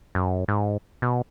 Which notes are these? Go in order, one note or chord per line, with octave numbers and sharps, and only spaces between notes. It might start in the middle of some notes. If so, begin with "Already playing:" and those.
F#2
G#2
B2